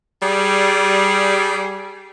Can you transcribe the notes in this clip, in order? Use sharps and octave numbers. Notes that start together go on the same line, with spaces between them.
G3 G#4